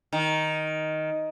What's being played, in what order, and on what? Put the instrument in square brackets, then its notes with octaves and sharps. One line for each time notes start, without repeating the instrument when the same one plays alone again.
[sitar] D#3